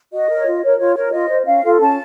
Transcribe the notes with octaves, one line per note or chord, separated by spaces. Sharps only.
F#4 D#5
A#4 C#5
F4
A#4 C#5
F4 C#5
A#4 C#5
F4 D#5
C5
C#4 F5
F4 A4
C#4 A5